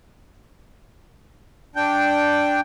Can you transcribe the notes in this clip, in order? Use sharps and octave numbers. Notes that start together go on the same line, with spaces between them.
D4 G5